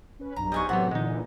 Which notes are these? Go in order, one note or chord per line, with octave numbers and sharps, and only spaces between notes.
C#4 B4
B1 G2 A#5
G#2 G3 D#5 G#5 C#6
A2 C3 E3 F#3 B3 C4 F#5
A#2 D3 E3 G#3 D#4